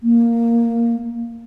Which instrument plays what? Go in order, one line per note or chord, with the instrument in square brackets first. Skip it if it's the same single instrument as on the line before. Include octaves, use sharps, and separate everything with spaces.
[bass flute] A#3